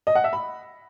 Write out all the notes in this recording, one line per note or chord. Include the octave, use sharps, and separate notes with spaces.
D#5
F#5
E5
B5